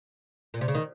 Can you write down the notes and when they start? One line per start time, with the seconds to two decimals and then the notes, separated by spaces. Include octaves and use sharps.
0.54 A#2
0.61 C3
0.68 C#3
0.74 D#3